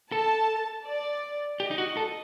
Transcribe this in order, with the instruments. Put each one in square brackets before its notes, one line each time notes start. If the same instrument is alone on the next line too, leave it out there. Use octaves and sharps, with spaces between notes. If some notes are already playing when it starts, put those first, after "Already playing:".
[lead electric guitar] A4 [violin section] A5
[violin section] D5
[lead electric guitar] G4 [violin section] D#5
[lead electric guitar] D#4
F#4
A4